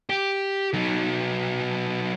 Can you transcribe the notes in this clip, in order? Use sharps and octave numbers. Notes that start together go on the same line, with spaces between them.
G4
F#3 D#4